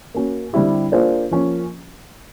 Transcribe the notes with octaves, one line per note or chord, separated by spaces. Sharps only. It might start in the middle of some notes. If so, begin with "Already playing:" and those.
A#3 C#4 F#4
D3 G3 C4 E4 G4
A#3 D4 F4 G#4 C5
F3 A#3 C#4